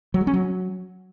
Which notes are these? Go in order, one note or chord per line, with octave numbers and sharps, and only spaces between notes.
F#3
G#3
C#4
F#3